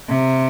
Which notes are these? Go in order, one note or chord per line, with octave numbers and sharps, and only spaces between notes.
C3